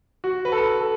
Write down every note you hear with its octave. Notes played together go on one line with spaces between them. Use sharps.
F#4
B4
A4
A4